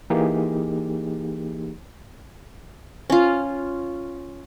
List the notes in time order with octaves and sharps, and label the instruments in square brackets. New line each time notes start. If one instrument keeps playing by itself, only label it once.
[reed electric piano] E3 A#3 D#4 G4 G#4
[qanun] C#4 F4